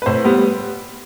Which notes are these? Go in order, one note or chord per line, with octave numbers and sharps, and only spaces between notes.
B4
A2 C5
G3 B3